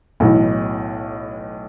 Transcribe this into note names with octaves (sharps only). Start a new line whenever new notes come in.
B1 A2 E3